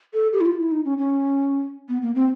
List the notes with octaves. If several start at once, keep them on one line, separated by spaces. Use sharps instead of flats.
A4
G4
E4
F4
E4
D#4
C#4
C#4
B3
A#3
C4